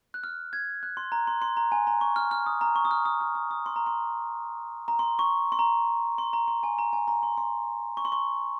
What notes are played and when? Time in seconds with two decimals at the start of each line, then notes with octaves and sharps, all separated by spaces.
0.14 F#6
0.24 F6
0.53 G#6
0.83 F#6
0.97 C6
1.12 A#5
1.27 C6
1.42 C6
1.57 A#5
1.72 G#5
1.87 A#5
2.01 C#6
2.16 F6
2.31 F6
2.46 D#6
2.61 A#5
2.76 C#6
2.85 D#6
2.91 F6
3.06 D#6
3.21 F6
3.35 D#6
3.51 D#6
3.66 C6
3.76 A#5
3.87 C6
4.88 A#5
4.99 C6
5.19 C#6
5.52 C6
5.59 A#5
6.18 C6
6.33 A#5
6.48 C6
6.63 G#5
6.79 A#5
6.93 G#5
7.08 A#5
7.23 C6
7.38 C6
7.97 C#6
8.05 C6
8.12 C#6